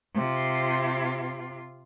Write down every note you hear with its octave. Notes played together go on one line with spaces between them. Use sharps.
C3 F4